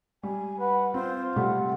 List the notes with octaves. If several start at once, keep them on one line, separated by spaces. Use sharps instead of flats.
G3 G#5
B4 F#5
C4 F4 C5
C3 G3 A3 F#5